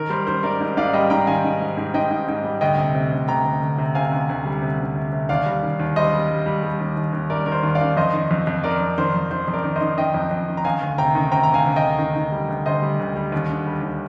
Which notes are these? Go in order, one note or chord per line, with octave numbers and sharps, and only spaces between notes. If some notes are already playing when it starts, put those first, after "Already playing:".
Already playing: D#3 A#4
G3 C5
D#3 C5
G#2 A#4 D5
G#2
G#2 D5 F5
G3 D#5 G5
G#2 G5 A#5
D#3 F5 G#5
G#2
G#2
G#2
G#2 D#5 G5
G#2
G#2
G3
D2 D#5 G5
C3
C3
D2
D2 G5 A#5
D2
D2
C3
C3 F5 G#5
D2
D2
G3
C3
D2
C3
C3
D#2 D5 F5
G3
D#3
D#2
G3 C5 D#5
G3
G3
G3
G3
D#2
D#2
D#2
G3 A#4 D5
D#3 A#4
C5
D#2
D5 F5
D#3
F2 C5 D#5
D#3
F2
F2
D#3 A#4 D5
F2
D#3 C5
F2
D#3 C5
F2
A#4 D5
D#3
C5 D#5
D#3
D#3 D#5 G5
F2
F2
D#3
A#5
D#3 F5 G#5
D2
C3 G5 A#5
D#3
C3 G5 A#5
A#5
D2
F5 G#5
D2
D#5 G5
D2
D#3
D#3
G3
D2
D2 C5 D#5
G3
D2
G3
D#2
D3
G3
D#2